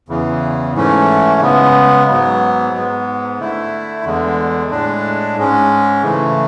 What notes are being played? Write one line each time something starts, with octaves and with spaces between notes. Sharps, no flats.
E2 C#3 E3
G#2 E3 A3 C#4
C#3 G#3 B3
G#2 F#3 B3
G#2 G#3 B3
D3 A3 E4
E2 D3 G#3
A2 G#3 D4
G#2 G#3 C#4
C#3 E3 A3